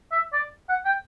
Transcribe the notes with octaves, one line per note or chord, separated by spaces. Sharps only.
E5
D5
F#5
G5